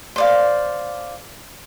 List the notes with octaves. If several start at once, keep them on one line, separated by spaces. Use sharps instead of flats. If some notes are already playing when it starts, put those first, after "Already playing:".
C5 D5 F5